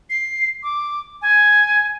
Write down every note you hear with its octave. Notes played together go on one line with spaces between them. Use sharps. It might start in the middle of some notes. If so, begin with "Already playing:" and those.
C7
D6
G#5